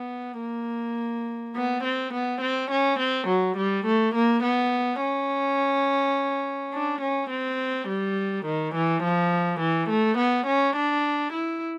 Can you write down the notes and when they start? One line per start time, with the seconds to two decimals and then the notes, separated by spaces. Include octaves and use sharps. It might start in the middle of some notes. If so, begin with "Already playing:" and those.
Already playing: B3
0.40 A#3
1.55 B3
1.84 C4
2.13 B3
2.41 C4
2.71 C#4
2.99 C4
3.28 F#3
3.57 G3
3.86 A3
4.15 A#3
4.44 B3
5.01 C#4
6.73 D4
7.02 C#4
7.30 C4
7.88 G3
8.46 D#3
8.75 E3
9.03 F3
9.60 E3
9.89 A3
10.18 B3
10.47 C#4
10.76 D4
11.33 E4